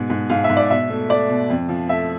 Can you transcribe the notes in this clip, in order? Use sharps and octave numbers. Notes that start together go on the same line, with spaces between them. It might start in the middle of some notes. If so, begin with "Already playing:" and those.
Already playing: G#2 B2
G#2
G#2 F5
E5
G#2
D5
B2 E5
A3
A3 D5
B2
F2
F3
A3 E5